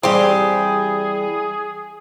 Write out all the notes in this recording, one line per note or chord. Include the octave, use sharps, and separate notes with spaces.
E3 G3 C4 G4 G#4